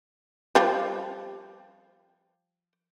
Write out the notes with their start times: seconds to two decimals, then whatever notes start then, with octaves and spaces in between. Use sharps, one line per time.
0.55 F3 G3